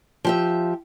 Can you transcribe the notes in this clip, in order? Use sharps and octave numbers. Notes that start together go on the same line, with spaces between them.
F3 G4 E5